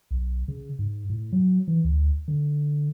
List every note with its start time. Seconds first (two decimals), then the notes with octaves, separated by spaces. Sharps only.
0.11 B1
0.48 C#3
0.79 G#2
1.10 A2
1.32 F#3
1.68 E3
1.84 D2
2.28 D3